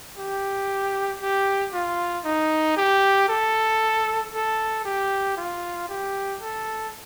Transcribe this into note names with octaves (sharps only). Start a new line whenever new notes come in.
G4
G4
F4
D#4
G4
A4
A4
G4
F4
G4
A4